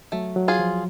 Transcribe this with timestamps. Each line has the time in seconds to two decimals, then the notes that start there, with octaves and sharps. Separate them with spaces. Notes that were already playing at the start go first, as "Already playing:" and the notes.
0.12 F#3 A3
0.36 F#3
0.48 F4 G#4
0.59 F3